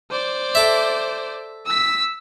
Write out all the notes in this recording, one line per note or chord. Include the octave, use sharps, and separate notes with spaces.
C5 D5
A4 E5
E6 B6